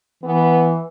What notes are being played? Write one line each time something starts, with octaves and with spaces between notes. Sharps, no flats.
E3 B3